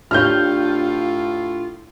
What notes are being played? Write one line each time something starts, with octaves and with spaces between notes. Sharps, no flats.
A2 D4 F4 G4 C#5 F6 G6